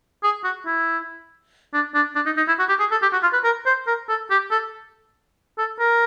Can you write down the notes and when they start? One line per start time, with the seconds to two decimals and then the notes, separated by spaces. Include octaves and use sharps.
0.23 G#4
0.44 F#4
0.66 E4
1.74 D4
1.94 D4
2.16 D4
2.26 D#4
2.37 D#4
2.48 E4
2.59 F#4
2.69 G4
2.80 G#4
2.91 A4
3.02 G4
3.13 F#4
3.23 F4
3.33 B4
3.44 A#4
3.66 C5
3.87 A#4
4.09 A4
4.31 G4
4.51 A4
5.58 A4
5.79 A#4